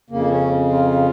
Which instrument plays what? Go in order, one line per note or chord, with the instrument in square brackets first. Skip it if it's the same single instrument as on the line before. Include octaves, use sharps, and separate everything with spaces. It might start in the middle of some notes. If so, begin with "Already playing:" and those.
[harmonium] F2 C#3 A#3
C#4
F4